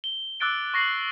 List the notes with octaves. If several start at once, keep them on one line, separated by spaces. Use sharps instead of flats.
G7
D6 E6 F#6 A6 D7 G7
C#6 A#6 C7 F#7